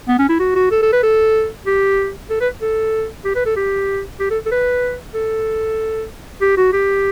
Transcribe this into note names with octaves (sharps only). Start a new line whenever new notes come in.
B3
C#4
E4
F#4
F#4
A4
A4
B4
A4
G4
A4
B4
A4
G4
B4
A4
G4
G4
A4
A4
B4
A4
G4
F#4
G4